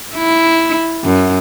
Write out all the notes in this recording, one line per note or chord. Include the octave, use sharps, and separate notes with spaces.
E4
F#2